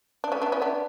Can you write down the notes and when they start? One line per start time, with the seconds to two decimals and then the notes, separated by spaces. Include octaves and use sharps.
0.24 D4
0.32 A3 C#4
0.42 B3 D4
0.52 C#4 E4
0.62 B3 D4